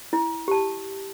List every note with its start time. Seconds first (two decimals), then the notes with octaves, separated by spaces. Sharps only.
0.13 E4
0.48 G4 A5